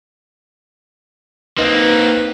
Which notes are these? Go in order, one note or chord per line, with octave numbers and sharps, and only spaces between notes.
A#3 C4 D#4 B4